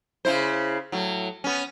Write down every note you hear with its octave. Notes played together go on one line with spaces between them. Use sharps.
C#3 E4 C5
A2 F#3
B3 C#4